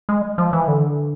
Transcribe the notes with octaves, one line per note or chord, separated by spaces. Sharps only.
G#3
F3
E3
D3